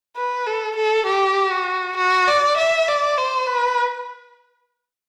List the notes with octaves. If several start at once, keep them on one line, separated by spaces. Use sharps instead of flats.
B4
A4
A4
G4
F#4
F#4
D5
E5
D5
C5
B4